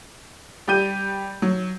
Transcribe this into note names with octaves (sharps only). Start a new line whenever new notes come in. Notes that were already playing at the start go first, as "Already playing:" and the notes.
G3 G4 G6 D#7
F#3